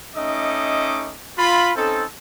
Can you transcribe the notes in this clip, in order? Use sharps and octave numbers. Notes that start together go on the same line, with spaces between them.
A3 C#4 D#4 D#5 E5 D6
F4 B5
C4 C#4 D#4 A4